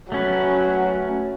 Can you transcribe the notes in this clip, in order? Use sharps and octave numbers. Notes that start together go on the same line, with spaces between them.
F#3 A3 C#4 B4